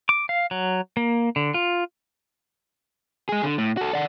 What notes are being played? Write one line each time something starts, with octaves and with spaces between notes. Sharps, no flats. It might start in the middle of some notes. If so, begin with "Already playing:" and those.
D6
F5
F#3
A#3
D3
F4
G#3 G#4
D3
A2
F#4 A4
D5 F#5